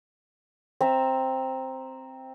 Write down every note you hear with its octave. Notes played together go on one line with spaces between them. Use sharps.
C4 E5 A#5